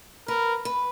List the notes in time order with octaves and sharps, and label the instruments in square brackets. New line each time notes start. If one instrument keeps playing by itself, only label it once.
[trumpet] A#4 [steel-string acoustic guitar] B4
[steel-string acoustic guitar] B4